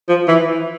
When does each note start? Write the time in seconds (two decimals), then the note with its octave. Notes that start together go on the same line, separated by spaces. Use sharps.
0.09 F3
0.28 E3